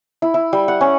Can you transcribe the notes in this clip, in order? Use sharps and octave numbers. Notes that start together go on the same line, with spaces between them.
E4
E4
G3
F#5
C#4